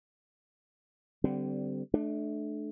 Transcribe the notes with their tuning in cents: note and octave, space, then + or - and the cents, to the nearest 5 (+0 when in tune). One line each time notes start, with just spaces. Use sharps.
D3 -10 G3 -20 C4 -35
A3 -25 D4 +15